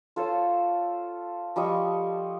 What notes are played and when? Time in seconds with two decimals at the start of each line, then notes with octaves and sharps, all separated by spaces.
0.16 F4 A4 C5 C#5
1.56 F3 G3 D#5 C#6